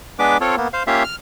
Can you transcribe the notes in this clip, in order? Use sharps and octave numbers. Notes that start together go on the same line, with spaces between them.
G#3 B3 D4 B4 D6
C4 F4 A4 C#5
A#3 B3
C5 F5
A#3 C#4 F4 G4 E5 F5
F6